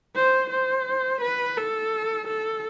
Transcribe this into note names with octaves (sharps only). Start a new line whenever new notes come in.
C5
C5
B4
A4
A4